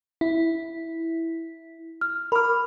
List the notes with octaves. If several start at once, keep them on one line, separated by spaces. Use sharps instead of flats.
E4
F6
A#4 B5 D6 F6